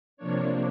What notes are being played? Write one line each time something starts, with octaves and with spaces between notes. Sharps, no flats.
C3 F3 A#3 D4 C#5